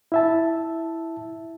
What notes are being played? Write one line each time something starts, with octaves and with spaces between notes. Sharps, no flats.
E4 E5 A5